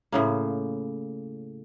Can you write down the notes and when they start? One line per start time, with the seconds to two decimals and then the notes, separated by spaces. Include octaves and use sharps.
0.12 A2 C#3 A#3